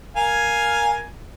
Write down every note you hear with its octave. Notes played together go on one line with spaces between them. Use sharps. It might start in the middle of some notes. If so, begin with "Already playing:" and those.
A#4 F5 G#5